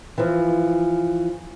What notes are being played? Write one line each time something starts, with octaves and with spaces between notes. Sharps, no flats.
E3 F3